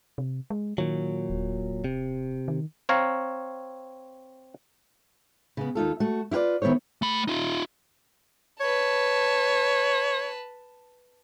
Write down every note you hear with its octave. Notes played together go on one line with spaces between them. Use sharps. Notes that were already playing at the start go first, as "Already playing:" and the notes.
C3
G#3
A#2 D#3 F#3
D#1
C3
D#3
C4 C#5 F5 A#5
C#3 B3
D#2 D#4 F4 A4
A3 F#4
E4 F4 G4 B4 D5
D#3 B3 E4 C5 C#5
A3 B5
D#4 F4
B4 C#5 A5